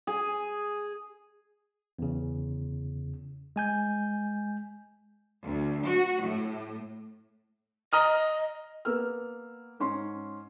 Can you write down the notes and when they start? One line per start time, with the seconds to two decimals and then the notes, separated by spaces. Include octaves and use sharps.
0.07 G#4
1.99 E2 C#3
3.56 G#3 G#5 G6
5.44 D2
5.85 F#4
6.24 A2
7.93 D#5 A#5 D#6 F6
8.85 A#3 B3 E6 F6
9.80 G#2 C#4 C6